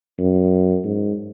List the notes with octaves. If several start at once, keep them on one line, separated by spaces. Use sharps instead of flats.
F#2
G#2